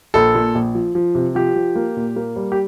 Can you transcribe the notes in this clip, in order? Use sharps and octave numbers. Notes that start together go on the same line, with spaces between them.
A#1 A4
A#2
A#1
F3
F3
C3
F3 G4
F3
A#3
A#2
A#3
G3
G4